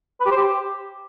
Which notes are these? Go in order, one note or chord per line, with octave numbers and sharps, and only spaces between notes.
B4
G4
C5
G4